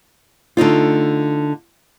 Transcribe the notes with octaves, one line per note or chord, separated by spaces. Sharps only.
D3 A3 D#4 F4